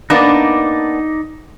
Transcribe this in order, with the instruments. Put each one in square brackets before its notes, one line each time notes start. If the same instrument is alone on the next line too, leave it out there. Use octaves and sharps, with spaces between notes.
[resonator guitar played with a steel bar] A#3 B3 D4 [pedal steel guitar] D#4 D5